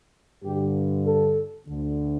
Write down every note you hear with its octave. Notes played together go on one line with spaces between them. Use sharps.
G2 D3 G4
A4
D2 D3